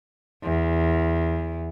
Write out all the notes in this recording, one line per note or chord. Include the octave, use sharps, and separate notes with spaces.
E2